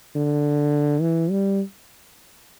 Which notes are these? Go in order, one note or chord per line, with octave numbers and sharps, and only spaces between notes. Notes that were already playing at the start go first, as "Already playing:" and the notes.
D3
E3
G3